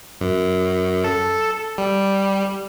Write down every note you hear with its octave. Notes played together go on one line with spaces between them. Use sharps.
F#2
A4
G3